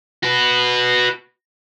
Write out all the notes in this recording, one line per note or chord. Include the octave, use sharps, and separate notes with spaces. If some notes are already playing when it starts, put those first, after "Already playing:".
F#4 B4